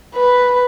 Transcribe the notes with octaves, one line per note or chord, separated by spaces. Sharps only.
B4